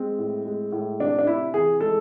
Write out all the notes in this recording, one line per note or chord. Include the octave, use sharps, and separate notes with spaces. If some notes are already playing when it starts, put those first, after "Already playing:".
Already playing: G#3 C4
A2
G#3
A2
C3 D4
D4
C3 E4
E3 G#4
G#3 A4